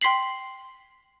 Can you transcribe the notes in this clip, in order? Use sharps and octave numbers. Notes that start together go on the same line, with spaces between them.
G5 C6 B6 C7 F#7